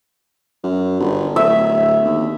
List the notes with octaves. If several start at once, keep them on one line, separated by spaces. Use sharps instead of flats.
F#2
G1
D1 E5
D#2